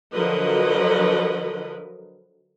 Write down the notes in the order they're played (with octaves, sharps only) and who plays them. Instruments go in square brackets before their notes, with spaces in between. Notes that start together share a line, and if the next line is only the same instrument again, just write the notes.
[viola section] D3 F3 F#3 A#4 B4 D#5